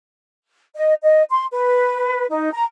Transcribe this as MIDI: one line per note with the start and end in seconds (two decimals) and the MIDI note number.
0.76 0.93 75
1.03 1.22 75
1.30 1.45 84
1.52 2.25 71
2.29 2.52 63
2.53 2.63 82